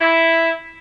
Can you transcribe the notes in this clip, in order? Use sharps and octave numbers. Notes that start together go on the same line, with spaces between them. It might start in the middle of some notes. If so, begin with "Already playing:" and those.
E4